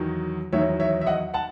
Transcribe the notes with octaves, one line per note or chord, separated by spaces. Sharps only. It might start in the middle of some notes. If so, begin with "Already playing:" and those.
Already playing: E2 D#3 F#3
E2 D#3 F#3 C#5 E5
C#5 E5
E5
D#5 F#5
F#5 A5